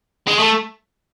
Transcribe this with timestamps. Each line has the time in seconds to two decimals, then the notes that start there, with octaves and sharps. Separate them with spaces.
0.28 G#3
0.40 A3